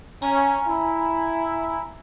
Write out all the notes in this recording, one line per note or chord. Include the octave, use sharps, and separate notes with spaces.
C#4 G#5 A#5
E4